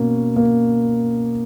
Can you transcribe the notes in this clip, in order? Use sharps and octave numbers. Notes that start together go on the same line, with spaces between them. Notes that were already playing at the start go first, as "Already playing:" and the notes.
Already playing: B2 A#3 C#4
A#3